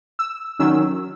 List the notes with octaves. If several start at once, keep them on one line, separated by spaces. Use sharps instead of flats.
E6
D#3 F#3 C#4 E6